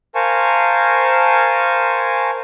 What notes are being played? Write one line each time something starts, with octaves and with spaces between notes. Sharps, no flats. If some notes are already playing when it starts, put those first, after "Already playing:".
A#4 C5 F5 G#5 A5 C#6